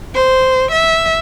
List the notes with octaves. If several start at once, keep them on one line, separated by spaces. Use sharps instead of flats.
C5
E5